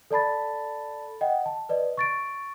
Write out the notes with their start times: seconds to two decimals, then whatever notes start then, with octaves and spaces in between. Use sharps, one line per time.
0.11 A4 D5 A5 B5 A6
1.21 D#5 F#5 G5
1.46 A5
1.69 B4 D5 D#5
1.98 C#6 A6 D7